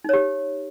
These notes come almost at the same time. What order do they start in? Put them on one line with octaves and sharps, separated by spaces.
D#4 C#5 G4